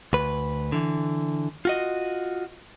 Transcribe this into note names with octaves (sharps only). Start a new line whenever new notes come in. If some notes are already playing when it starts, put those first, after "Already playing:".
D2 B4
D3 E3
F4 F#4 D#5